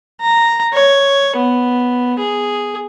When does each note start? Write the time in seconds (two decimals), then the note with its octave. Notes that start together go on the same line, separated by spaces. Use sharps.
0.21 A#5
0.74 C#5
1.37 B3
2.19 G#4